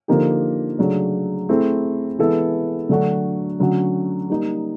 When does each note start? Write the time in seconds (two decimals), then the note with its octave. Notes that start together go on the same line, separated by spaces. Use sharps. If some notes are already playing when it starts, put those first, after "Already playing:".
0.08 D3 F3 A#3 D#4 G4
0.79 C#3 F#3 A3 D4
1.49 A3 C4 E4 G#4
2.19 E3 G#3 B3 E4 A4
2.89 D3 F#3 A3 D4 F#4
3.60 D3 F#3 A3 C#4 F#4
4.30 G3 A#3 D#4